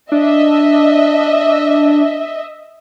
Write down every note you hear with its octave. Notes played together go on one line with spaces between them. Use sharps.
D4 D#5 E5